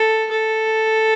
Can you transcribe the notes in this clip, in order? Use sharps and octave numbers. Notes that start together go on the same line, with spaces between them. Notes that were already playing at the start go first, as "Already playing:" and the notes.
Already playing: A4
A4